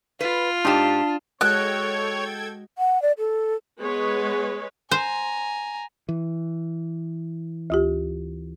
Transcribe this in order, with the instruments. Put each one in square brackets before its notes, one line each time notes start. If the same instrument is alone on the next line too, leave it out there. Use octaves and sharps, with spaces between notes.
[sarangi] F4 [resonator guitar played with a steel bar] B4
[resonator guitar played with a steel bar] G#2 G4 [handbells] D4 A5
[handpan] G#3 F#4 D#5 [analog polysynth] A4 G5 G#6 [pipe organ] C#5 [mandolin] F#6
[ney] F#5
D5
A4
[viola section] G#3 B4 C#5 [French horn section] B3 G#4
[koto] C5 [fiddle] G#5 A#5
[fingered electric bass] E3
[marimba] D2 F4 G4